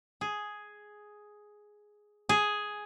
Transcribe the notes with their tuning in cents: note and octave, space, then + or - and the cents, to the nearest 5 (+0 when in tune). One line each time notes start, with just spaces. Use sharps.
G#4 +5
G#4 +5